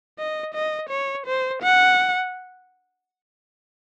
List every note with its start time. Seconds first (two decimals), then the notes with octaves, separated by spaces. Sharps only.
0.19 D#5
0.54 D#5
0.90 C#5
1.26 C5
1.62 F#5